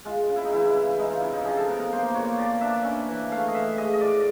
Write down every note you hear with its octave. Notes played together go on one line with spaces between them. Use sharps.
G#3 F4
C#3
E4
D#4
E3 E4
C#3
G#3 D#4
F4
C3 E4
D#4
F3 G#4
A4
B3 A#4
A#4
A#3 C5
A#2 C#5
F3 D5
D4 E5
C#4
E3
A3 F5
D#5
E3 E5
G#3 D#5
D#5
A2 D5